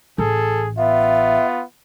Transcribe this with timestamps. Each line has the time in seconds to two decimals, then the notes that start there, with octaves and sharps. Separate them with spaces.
0.18 A1 G#4 A4
0.77 B3 F4 E5